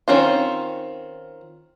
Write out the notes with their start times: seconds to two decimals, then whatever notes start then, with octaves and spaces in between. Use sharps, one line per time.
0.08 D#3 C4 C#4 F4